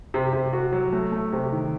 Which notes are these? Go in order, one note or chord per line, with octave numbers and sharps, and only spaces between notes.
C3
C3
F#4
F#3
A3
A3
C3
D#3